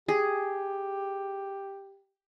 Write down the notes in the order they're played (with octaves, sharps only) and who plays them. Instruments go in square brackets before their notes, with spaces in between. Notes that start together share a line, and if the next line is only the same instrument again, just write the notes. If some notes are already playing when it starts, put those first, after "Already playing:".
[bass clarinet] G4 [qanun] G#4